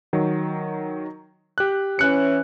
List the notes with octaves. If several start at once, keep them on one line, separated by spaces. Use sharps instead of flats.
D#3 F#3
G4 F#6
E3 C#4 F#6 C#7